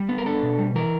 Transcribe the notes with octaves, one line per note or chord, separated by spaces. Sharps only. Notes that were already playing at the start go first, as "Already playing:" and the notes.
Already playing: G3
B3
A#4
D4 A4
B2
G3
E3 A#4